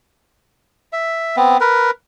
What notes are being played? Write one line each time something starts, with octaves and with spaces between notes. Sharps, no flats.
E5
B3 C4
A#4 B4